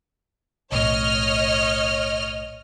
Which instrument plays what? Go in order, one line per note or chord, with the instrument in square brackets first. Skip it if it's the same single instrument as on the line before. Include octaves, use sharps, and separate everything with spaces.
[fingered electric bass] B1 A2 [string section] C#5 D#5 F6